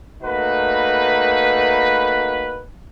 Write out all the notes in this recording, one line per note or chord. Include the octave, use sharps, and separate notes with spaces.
A3 A#3 D#4 F#4 B4